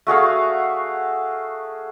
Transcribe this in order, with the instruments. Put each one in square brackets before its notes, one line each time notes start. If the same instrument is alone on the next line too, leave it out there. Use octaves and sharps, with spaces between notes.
[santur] A3 F#4 G#4 F5